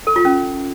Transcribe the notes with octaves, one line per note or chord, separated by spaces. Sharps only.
A4
F4
C#4